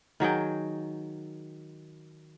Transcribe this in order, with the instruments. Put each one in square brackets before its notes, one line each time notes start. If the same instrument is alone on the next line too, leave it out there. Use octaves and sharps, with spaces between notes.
[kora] D#3 F#3 G#4 G5